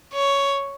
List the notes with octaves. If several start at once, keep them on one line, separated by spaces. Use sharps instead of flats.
C#5